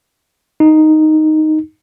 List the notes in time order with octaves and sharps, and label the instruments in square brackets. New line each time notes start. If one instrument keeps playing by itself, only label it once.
[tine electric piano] D#4